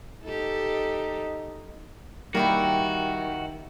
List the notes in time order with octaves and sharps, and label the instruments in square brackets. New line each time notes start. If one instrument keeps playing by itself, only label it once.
[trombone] D#4 [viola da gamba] G4 A4
[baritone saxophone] D#3 [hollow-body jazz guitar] G3 A#3 [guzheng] E4 G4 A#4 [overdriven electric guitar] F#4